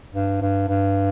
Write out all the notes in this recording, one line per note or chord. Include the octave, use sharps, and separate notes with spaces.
G2
G2
G2